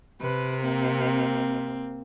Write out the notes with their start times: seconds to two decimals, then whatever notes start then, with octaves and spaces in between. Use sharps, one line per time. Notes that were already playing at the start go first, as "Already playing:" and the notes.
0.21 C3 B4
0.60 A#3 C4